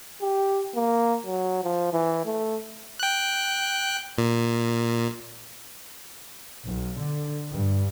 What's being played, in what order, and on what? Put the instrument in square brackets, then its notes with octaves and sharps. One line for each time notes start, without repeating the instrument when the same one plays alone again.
[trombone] G4
A#3
F#3
F3
E3
A3
[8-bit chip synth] G5 F#6
A#2
[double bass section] B1
D3
G2